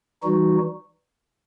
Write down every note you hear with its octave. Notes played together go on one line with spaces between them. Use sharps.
E3 G3 D#4 F#4